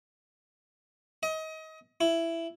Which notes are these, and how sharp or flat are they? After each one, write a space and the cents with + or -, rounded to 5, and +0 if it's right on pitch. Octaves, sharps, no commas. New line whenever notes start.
D#5 +30
E4 +10